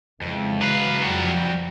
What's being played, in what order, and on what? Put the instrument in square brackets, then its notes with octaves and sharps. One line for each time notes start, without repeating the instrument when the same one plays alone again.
[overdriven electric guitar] F2 [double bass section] C#3 E3 G#3
[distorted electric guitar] F#3 F5 [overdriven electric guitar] B4
[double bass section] F2 F3 [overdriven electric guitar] G3 F#4